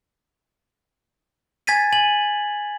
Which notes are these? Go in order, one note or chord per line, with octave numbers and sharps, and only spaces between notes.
G#5 G#6 A6 B6 D#7
G#5 F#7